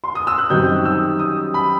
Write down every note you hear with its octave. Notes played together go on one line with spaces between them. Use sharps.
C6
D#6
E6
F#6
F#2 D#3 G3 C4 D#4 G6
E6
D#6
B5